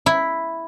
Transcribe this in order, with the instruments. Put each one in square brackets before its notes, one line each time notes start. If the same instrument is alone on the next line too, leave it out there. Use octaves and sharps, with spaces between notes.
[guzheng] E4